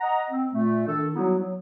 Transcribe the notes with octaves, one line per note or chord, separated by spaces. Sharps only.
D#5 F#5 A#5
C4
A#2 A3
D#3 D4 A4
F#3 G3 B3 D#4 E4 F#4
F#3